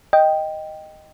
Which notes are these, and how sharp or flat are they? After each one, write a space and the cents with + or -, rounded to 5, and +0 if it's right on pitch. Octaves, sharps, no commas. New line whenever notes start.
D#5 +0 G5 +0